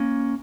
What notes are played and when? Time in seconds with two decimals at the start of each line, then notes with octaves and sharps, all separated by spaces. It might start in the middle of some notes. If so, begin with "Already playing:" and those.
Already playing: A#3 C#4